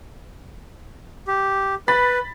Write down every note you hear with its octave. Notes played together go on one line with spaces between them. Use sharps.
G4
B4 B5 A6 B6